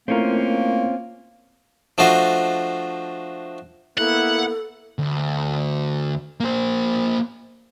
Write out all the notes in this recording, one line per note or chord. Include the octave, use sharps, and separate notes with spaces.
A3 A#3 C4 C#4 E4 F4 A#4
F3 A3 D4 F#4 C5 D#5
A#3 B3 E4 A4 F#5
D2
A#3 C5